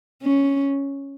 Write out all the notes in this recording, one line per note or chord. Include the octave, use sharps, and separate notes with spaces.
C#4